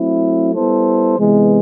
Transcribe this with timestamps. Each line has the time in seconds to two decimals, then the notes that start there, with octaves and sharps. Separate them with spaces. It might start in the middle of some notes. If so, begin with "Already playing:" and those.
Already playing: F#3 A3 C4 E4
0.53 G3 B3 E4 A4 C5
1.16 C3 E3 G#3 B3